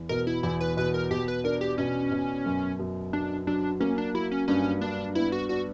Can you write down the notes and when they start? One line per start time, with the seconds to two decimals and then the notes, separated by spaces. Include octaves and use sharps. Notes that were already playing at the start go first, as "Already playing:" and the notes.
Already playing: E2
0.09 B2 A#4
0.27 E4
0.43 E2 E4
0.61 B4
0.77 B2 B4
0.94 A#4
1.11 B2 G4
1.28 B4
1.44 D4 A#4
1.61 G4
1.78 B2 C#4
2.12 B2
2.46 F#2
2.80 F#2
3.13 F#3 D4
3.47 F#3 D4
3.80 A#3 C#4
3.98 D4
4.14 F#3 E4
4.31 C#4
4.48 G2 C#4
4.81 G2 D4
5.15 B3 E4
5.32 F#4
5.49 D4 F#4